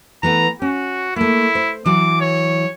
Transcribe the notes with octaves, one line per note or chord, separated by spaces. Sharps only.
E3 A3 B3 A#5
C#4 F#4
A3 A#3 E4
C5
E3 F#3 D6
C#5